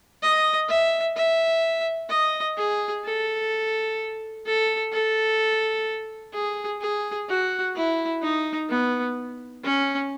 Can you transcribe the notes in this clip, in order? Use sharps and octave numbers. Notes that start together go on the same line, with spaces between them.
D#5
E5
E5
D#5
G#4
A4
A4
A4
G#4
G#4
F#4
E4
D#4
B3
C#4